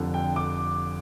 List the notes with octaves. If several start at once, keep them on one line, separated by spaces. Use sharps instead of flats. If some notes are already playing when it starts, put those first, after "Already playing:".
Already playing: F1 F2 D3
G5
D6